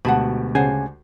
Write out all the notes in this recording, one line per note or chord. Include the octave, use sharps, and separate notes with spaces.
D2 B2 G#3 G4 F#5 A5 B5
C#3 D4 C5 F#5 G#5